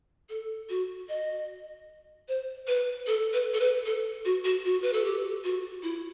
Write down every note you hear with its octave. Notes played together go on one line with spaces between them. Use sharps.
A4
F#4
D#5
C5
B4
A4
B4
A4
B4
A4
F#4
F#4
F#4
B4
A4
G4
F#4
E4